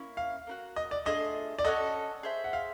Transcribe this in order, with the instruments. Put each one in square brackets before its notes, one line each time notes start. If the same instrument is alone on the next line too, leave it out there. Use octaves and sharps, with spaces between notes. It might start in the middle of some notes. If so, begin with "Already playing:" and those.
Already playing: [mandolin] A#3 C#4 E4
[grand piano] F5
[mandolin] A#3 D#4 F#4
[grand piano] D#5
D5
[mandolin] A3 D4 F4 G#4 [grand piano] D#5
[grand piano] D5
[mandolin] C#4 F#4 A4 [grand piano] D#5
[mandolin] G#4 C5 E5
[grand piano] F#5
F5